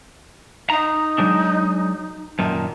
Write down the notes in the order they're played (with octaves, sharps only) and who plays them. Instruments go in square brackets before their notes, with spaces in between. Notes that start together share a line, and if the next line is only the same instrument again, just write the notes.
[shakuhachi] D#4 [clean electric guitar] A#5
[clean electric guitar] F#3 G#3 D4
[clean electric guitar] F#2 A#2 D#3 [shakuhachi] A5